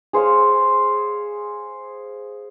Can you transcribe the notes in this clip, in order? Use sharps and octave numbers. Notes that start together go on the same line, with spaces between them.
G#4 C5 C#5 F5